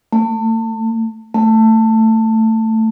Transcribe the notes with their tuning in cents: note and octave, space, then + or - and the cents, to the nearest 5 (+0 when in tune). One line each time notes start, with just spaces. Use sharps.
A3 +30
A3 +15